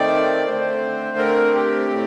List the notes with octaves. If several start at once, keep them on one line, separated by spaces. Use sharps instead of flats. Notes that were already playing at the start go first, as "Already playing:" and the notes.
Already playing: D#3 A3 C4 D5
D3 A3 C4 C5
A#4
G4
A2 A3 C4